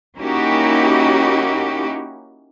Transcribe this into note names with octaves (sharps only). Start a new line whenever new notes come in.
A#3 C#4 D#4 E4 F#4 G4